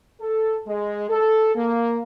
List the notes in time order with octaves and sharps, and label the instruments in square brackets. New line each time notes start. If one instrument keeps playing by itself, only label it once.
[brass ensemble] A4
G#3
A4
A#3